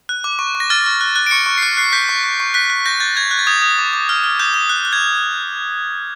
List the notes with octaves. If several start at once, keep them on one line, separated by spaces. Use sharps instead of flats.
F#6
D6
C#6
C#6
A#6
F6 A6
F6
F#6
F#6
D7
C#6 C#7
C#6
C7
F#6 C#7
F#6 C7
G6 B6
C#6
C#6
C#6
F#6 B6
F#6
G6 A#6
G6 A6
F#6 G#6
F#6
A6
D#6 G#6
D#6
D6
D6
F6
F6
D#6 G6
D#6
F#6
F#6
G#6